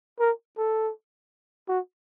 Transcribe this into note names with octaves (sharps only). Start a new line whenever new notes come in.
A#4
A4
F#4